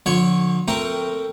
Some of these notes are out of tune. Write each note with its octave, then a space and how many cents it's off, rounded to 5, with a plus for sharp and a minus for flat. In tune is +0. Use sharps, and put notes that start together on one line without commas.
D3 +0 F3 +40 C#5 +5
A3 +15 C4 +0 A#4 +0